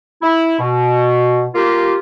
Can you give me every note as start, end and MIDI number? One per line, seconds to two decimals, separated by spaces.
0.22 0.54 64
0.59 1.45 47
1.55 1.97 58
1.55 1.97 65
1.55 1.97 67